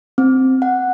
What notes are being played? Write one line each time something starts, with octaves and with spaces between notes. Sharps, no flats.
C4
F#5